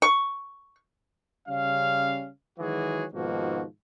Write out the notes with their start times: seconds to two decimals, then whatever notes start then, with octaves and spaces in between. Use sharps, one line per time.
0.02 C#6
1.47 C#3 G3 C#4 F5
2.59 D#3 E3 F#3 G#3 F#4 G#4
3.14 G#2 B2 D#3 F3 A#3 F#4